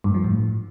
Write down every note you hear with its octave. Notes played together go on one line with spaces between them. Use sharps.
G2
F3
A2